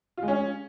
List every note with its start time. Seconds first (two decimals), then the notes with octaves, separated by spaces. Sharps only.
0.17 F4
0.23 G#3
0.28 C#4